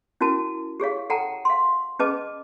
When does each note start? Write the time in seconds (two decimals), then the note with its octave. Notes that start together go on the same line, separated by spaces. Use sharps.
0.21 C#4 E4 F#4 A#4 A5
0.80 G4 G#4 C#5 F5
1.10 A4 F#5 G5 A5 A#5
1.45 F5 C6
1.99 C#4 G#4 B4 D#5 A5 D6